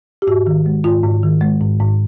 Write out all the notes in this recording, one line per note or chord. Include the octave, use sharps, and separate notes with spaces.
G4
G#2 F#4
D#3
G#3
G#2 F4
G#2
D#3
G#3
G#2
G#2